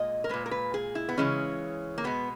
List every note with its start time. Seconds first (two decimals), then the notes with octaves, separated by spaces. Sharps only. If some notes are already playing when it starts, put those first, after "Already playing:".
Already playing: A#2 G#3 D#5
0.24 A#4
0.29 A#2 G#3 B4
0.46 A#4
0.51 B4
0.74 G#4
0.95 E4
1.09 B3
1.18 C#3 E3 G#3 C#4
1.98 A#3
2.04 B2 G#3 B3